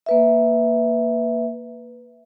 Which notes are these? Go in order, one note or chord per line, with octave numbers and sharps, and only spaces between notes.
A#3 B4 E5